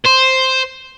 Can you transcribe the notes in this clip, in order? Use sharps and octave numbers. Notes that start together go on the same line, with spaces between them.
C5